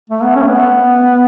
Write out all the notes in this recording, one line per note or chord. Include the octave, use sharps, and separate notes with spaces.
A3
B3
C#4
A3
B3